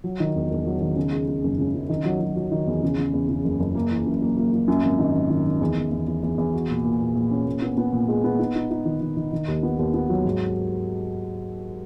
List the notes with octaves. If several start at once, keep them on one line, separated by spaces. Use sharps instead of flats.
F#3
D#3
E1
E1
F#3
D#3
C#3
G#3
G#3
F#1
C#3
F#2
D#3
F#3
F#3
F#3
D#3
E2
C#3
C#3
E2
C#3
F#1
F#1
A#3
E3
F#2
A#3
A#3
A#3
F#2
G#1
D#3
G#1
D#3
D#3
E2
E2
E2
E2
E2
E2
F#4
A#2
A#2
A#2
A#2
C#4
A#2
B3
B3
A#2
G#3
B3
D#4
D#4
D#4
D#3
D#3
D#3
D#3
D#2
B3
D#2
B3
F#3
G#2